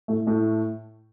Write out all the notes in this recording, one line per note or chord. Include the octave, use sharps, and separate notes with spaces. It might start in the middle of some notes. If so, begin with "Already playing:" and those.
A2 A3
A2 A3